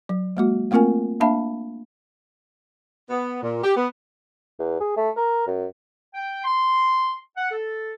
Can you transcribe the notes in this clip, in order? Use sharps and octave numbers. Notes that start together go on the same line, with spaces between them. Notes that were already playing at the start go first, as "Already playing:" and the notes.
F#3
G#3 A#3 F#4
A3 A#3 C4 F4 A#4 G#5
A#3 D4 E5 F5 A5 B5
B3
A#2
G4
B3
E2
G#4
A3
A#4
F#2
G5
C6
F#5
A4